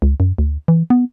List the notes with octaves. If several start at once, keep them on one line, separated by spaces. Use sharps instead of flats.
C#2
F#2
D2
E3
B3